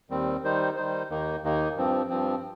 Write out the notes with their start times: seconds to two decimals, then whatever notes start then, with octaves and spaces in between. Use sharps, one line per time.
0.10 D#2 D#3 G3 C4
0.43 D#3 G3 D#4 C5
0.76 D#3 G3 D#4 C5
1.10 D#2 D#3 A#3 D#4
1.43 D#2 D#3 A#3 D#4
1.76 G2 F3 C4
2.09 G2 F3 C4